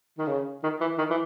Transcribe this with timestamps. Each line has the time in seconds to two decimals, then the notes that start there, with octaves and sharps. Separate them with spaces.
0.18 D#3
0.27 C#3
0.63 D#3
0.80 E3
0.98 D#3
1.10 E3